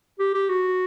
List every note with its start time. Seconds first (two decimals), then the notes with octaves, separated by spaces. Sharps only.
0.19 G4
0.34 G4
0.50 F#4